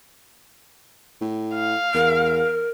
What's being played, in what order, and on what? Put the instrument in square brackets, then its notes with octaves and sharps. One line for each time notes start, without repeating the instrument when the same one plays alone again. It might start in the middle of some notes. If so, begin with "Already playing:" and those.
[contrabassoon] A2
[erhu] F5
[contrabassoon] E2 [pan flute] A#4